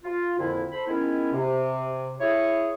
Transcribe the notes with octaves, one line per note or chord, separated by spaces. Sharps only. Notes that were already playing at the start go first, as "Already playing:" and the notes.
F4
F2 A#2 D3 E4
A4 C5 B5
D#3 G#3 B3 C#4 E4
C3
E4 G#4 C#5